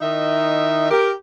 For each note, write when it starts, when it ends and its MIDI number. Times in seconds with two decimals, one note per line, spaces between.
0.01 0.89 51
0.01 0.89 63
0.01 0.89 64
0.01 0.89 75
0.01 0.89 76
0.91 1.11 67
0.91 1.11 70